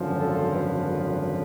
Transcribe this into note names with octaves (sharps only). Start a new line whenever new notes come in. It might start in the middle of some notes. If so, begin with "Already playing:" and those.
Already playing: G#1 F#2 D3 F3
A4
B4